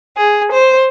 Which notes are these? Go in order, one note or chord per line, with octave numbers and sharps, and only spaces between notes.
G#4
C5